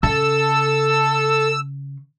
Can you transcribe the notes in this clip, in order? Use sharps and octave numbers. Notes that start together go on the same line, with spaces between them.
C#3 A4 E6